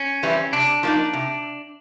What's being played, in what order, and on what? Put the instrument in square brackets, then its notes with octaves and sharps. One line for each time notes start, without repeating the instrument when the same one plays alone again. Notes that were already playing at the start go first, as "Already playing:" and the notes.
Already playing: [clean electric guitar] C#4
[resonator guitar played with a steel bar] E3 G3 C4 E4
[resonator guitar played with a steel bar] C3 [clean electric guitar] D4
[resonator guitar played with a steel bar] F3 A#3 D#4
C3